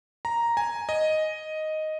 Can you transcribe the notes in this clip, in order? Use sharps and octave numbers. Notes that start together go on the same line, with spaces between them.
A#5
G#5
D#5